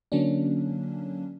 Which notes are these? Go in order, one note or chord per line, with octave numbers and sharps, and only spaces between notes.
D3 F#3 A#3 C#4 D4